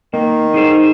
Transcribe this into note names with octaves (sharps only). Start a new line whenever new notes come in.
D#3 A#3
D#4 G#4 C5